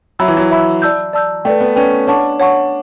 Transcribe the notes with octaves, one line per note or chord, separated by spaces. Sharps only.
F#3 E5 B5 E6
E3
F#3
E5 B5 E6
D5 A5 E6 G6
D5 A5 E6 G6
A3 B4 D5 G5
B3
C#4 B4 D5 G5
D4 C#5 F#5 A5 C#6
C#5 F#5 A5 C#6